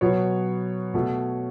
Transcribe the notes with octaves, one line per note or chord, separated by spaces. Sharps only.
B2 F#3 B3 C#5
B2 A3